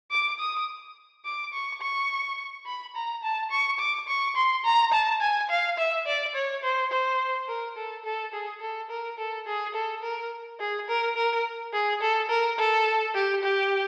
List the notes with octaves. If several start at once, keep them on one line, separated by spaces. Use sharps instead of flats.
D6
D#6
D6
C#6
C#6
B5
A#5
A5
C#6
D6
C#6
C6
A#5
A5
G#5
F5
E5
D5
C#5
C5
C5
A#4
A4
A4
G#4
A4
A#4
A4
G#4
A4
A#4
G#4
A#4
A#4
G#4
A4
A#4
A4
G4
G4